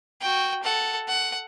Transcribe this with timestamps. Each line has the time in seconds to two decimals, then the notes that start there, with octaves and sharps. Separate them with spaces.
0.21 F#4 G5
0.63 A4 F#5
1.08 F#5